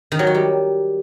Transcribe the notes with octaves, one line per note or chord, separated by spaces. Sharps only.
D#3
F#3
F#4
G3